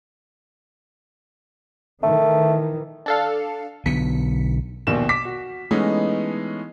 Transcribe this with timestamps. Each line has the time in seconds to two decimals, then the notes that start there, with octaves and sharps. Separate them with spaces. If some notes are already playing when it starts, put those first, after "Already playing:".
2.03 D#3 E3 A3
3.06 D4 A4 F5
3.86 B1 D3 B3 B6 C#7
4.87 A#1 D#2 B2 D#3 E7
5.09 D6 B6
5.25 F#4
5.71 E3 G#3 A3 B3 C#4 D#4